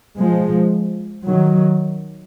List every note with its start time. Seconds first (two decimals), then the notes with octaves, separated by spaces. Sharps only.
0.18 F3 G#3
1.26 D#3 F#3